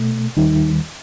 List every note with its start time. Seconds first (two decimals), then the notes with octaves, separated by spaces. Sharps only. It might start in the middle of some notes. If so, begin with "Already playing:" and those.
Already playing: B2 A3
0.37 D#2 D#3 G3 D#4